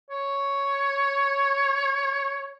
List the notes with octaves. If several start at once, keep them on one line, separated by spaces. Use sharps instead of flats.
C#5